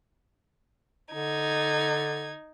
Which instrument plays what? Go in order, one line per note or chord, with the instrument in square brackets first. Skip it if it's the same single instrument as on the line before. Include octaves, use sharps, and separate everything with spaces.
[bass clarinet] D3 [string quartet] D#4 G#6